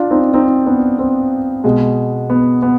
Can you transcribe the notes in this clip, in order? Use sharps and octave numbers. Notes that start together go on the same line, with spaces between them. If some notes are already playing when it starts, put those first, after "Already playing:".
Already playing: D4 F4
C4 D#4
C4 D#4
B3 D4
C4
B2 G#3
B3
B3